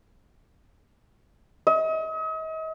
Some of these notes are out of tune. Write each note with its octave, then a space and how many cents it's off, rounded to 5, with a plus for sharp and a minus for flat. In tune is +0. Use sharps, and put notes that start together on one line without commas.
D#5 +40